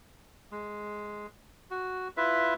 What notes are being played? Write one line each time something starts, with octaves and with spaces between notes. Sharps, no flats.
G#3
F#4
E4 F4 B4 E5